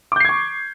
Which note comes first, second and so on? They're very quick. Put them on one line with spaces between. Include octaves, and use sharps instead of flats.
D6 G6 C7 G#6 C#6